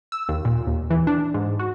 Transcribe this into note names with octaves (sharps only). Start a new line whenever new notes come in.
E6
D#2
A#2
D#2
E3
D4
G#2
F#4